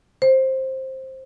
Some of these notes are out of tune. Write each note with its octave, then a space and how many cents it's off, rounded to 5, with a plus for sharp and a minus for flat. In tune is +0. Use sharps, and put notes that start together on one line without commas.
C5 +10